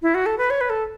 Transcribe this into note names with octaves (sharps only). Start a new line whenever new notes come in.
E4
F#4
A4
B4
C#5
B4
A4